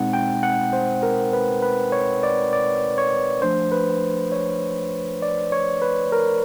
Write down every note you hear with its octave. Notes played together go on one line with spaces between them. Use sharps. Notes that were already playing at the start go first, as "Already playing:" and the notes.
Already playing: B2 G#3 C4 D#4 F#5
G5
F#5
C5
A#4
B4
B4
C#5
D5
D5
C#5
F3 A3 D4 C5
B4
C#5
D5
C#5
B4
A#4